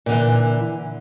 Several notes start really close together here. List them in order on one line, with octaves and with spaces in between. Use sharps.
A#2 D3 E3